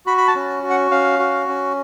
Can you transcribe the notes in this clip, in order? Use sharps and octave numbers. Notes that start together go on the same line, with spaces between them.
F#4 B5
B5
A5
C#4
F#4
F#5
C#4 F5
F#4
C#4